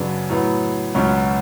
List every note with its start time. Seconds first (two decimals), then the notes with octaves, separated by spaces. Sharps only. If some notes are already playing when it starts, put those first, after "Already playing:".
Already playing: F#2 C#3 F#3 B3 D4
0.30 A2 F#3 B3
0.94 C#2 B2 F#3 C#4